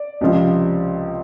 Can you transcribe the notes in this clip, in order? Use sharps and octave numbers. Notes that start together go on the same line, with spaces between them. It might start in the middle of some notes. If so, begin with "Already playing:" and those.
Already playing: D5
C#2 C3 F3